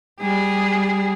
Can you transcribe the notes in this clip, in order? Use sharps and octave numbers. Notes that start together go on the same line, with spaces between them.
G3 G#4